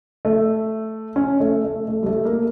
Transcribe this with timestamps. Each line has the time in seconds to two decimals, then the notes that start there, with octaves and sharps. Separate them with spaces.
0.25 A3
1.16 C#4
1.40 A3
1.64 A3
1.88 A3
2.03 G3
2.06 A3
2.25 A#3